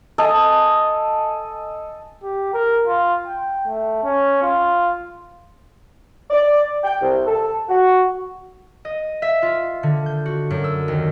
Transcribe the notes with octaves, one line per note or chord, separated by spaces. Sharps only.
A4 D#5 G#5
G4
A#4
F4
G5
A3
C#4
F4
D5
G5
C2
A4
F#4
D#5
E5
F4
D3
G6
F#4
F#2
E6
D#2